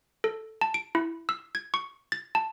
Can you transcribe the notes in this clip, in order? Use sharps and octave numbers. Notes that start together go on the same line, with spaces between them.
A4
A5
D7
E4
E6
G#6
C#6
A6
A5